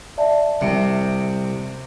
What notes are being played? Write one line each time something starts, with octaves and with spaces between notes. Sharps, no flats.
D5 E5 A5
C2 C3